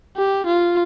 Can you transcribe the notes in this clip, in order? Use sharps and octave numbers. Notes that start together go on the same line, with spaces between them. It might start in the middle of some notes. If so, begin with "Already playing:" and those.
G4
F4